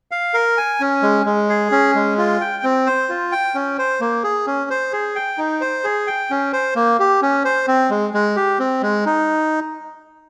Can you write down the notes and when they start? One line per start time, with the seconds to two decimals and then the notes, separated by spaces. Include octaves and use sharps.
0.11 F5
0.34 A#4
0.57 G#5
0.80 C#4
1.02 G#3
1.26 G#3
1.49 G#4
1.72 C#4
1.95 G#3
2.18 F4
2.41 G5
2.63 C4
2.86 C5
3.09 F4
3.32 G5
3.55 C#4
3.78 C5
4.01 A#3
4.24 G#4
4.47 C#4
4.70 C5
4.93 G#4
5.15 G5
5.38 D#4
5.61 C5
5.84 G#4
6.07 G5
6.31 C#4
6.53 C5
6.76 A#3
6.99 G4
7.22 C#4
7.45 C5
7.68 C4
7.90 G#3
8.14 G#3
8.36 G4
8.59 C4
8.82 G#3
9.06 D#4